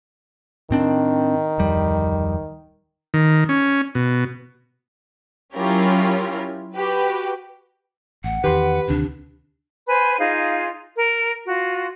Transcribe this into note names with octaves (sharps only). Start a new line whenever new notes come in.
A2 D#3 C4 D4
D1 F2 G3
D#3
C#4
B2
F#3 C#4 E4 F4 G4 A#4
F#4 G4 B4
A1 F#5
E2 D#3 G4 B4 C6
D2 C3 D#3 D4
B4 C5 G#5 B5
D#4 F4 G#4 F5
A#4
F4 F#4